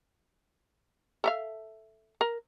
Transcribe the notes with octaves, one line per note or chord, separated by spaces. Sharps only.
A4 E5 F5
A#4